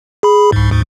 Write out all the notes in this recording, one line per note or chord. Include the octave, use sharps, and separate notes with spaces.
G#4 B5
C2 G#2
D2 G#2